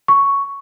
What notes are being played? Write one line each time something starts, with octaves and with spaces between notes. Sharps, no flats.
C#6